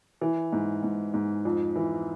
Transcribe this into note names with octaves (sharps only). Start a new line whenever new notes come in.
E3
G#2
G#2
G#2
F2
E3